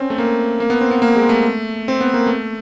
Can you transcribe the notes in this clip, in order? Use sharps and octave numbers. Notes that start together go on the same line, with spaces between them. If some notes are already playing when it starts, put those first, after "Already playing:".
Already playing: C4 C#4
A3
A#3
A#3
B3
C4
B3
A#3
G#3
A3
C4
B3
A#3
A3